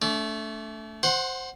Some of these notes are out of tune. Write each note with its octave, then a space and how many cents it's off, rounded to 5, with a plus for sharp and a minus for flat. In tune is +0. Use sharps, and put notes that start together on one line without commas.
A3 +0 D4 -40
C5 +0 F#5 +0 C6 +30